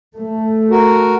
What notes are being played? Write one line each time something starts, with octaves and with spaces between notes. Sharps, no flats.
A3
F#4 A#4